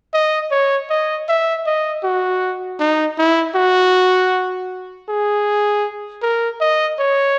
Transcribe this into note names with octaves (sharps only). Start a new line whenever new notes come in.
D#5
C#5
D#5
E5
D#5
F#4
D#4
E4
F#4
G#4
A#4
D#5
C#5